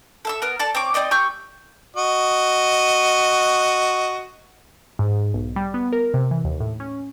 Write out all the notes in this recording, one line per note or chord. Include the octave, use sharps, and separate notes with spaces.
A4 E5 E6
B3 A#4 F6
A4 D5 A5
C4 C#5 D6
C4 D#4 D5 D#5
G4 C#6 E6 G6
F#4 D#5
G#2
B1
G3
B3
A#4
C3
E3
D#2
A2
C#4